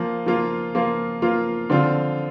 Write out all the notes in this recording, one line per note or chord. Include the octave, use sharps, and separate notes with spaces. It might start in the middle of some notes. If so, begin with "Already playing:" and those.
Already playing: F3 A#3 F4
F3 A#3 F4
F3 A#3 F4
F3 A#3 F4
D3 F3 C4 F4